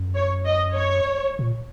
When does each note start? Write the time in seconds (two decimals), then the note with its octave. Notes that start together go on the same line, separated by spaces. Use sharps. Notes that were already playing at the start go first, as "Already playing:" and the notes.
Already playing: F#2
0.15 C#5
0.45 D#5
0.75 C#5
1.39 A#2